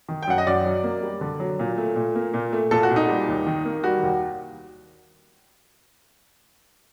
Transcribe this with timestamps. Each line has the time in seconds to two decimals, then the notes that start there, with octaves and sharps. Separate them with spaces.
0.09 D#3
0.23 G5
0.27 F#2 F#5
0.38 D#5
0.47 F#2 D5
0.66 F#3
0.84 A#3
1.03 G3
1.21 D3
1.40 F#3
1.59 A#2
1.78 A3
1.96 A#2
2.15 A#3
2.34 A#2
2.53 A3
2.71 A#2 A4
2.83 F#4
2.90 A#2
2.96 D#4
3.08 G3
3.28 D#2
3.47 D#3
3.65 A#3
3.84 G3 F#4
4.03 D#2